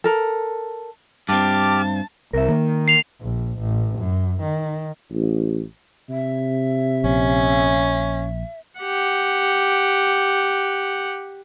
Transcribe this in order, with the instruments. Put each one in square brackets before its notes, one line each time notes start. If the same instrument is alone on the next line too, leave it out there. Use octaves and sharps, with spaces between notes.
[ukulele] A4 A#4
[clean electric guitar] G2 C4 [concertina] G4 D6 F6 [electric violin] A5
[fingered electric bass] C2 [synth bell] A#4 E5
[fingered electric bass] D#3 [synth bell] A#3
[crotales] C7 F7
[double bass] A#1
A1
F#2
D#3
[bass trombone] A1
[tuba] C3 [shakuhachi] E5
[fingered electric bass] A#1 [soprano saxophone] C#4
[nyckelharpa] G4 F#5